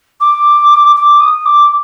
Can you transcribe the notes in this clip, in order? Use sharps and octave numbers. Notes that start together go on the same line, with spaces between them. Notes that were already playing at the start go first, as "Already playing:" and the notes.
D6
D6
D#6
D6